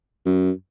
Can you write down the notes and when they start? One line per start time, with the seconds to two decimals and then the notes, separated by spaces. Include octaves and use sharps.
0.26 F#2